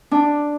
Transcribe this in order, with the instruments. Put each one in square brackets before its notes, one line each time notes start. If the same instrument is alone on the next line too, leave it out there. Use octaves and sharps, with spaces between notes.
[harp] D4